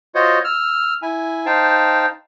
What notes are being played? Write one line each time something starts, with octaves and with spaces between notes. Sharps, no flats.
F4 F#4 C5 C#5 D#5
E6 F6
E4 G#5
D#4 C5 F5 G5 A5